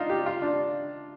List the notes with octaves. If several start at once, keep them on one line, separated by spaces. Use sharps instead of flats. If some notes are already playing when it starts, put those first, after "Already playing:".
Already playing: D4 D#4 F4
G4
F4
D4